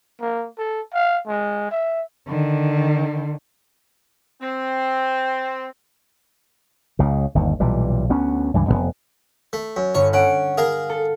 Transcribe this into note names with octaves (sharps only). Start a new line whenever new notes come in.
A#3
A4
F5
G#3
E5
D3 D#3
C4
C#2 C#3
G1 D#2
B1 A#2 E3 G3
D2 B3 C#4
C#2 G2 E3
F1 G2 B3
A3
F#2
G1 C#5
C#4 F#5 D7
G#4 A#4 F5
A4